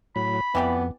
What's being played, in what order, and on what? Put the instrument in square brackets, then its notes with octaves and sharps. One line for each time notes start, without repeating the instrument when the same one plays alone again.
[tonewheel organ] A2 F#3 [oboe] B5
[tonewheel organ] F2 [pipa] E3 G4 D5 [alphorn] B3